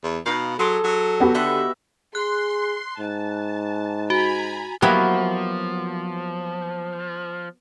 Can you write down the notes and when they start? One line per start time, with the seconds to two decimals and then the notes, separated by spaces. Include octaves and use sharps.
0.03 E2
0.26 B2 D#4 F5
0.59 F#3 G#4 A4 C6 D6
0.84 F#3
1.20 B3 F#4 G4
1.34 D3 D#5 E5 F#5
2.15 G#4 C6 F#6
2.99 G#2 A5
4.10 F#4 G#5 A#5 B5
4.82 F3 F#3 A#3 B3 E4 F#4 G4